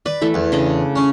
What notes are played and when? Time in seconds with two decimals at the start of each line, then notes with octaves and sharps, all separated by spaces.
0.06 B4 D5
0.21 E3 A3 A4
0.34 E2
0.52 C#3 D4 D#5
0.96 C#4